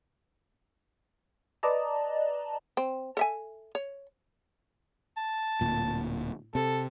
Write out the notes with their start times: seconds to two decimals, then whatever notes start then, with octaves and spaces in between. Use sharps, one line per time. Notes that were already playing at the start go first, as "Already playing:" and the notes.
1.63 B4 D5 D#5 A5 A#5
2.77 C4
3.17 A4 E5 G#5
3.75 C#5
5.17 A5
5.61 D1 A#2
6.55 C3 A4